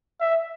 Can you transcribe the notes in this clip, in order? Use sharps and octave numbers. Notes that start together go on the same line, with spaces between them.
E5